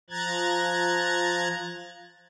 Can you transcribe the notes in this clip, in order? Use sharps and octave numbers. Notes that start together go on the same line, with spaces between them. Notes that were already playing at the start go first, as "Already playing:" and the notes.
F3 A#5 F#6 G#6 A6